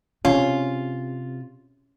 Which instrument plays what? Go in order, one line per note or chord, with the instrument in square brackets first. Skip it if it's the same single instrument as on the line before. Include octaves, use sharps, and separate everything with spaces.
[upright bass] C3 [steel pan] C#4 [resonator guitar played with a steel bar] F4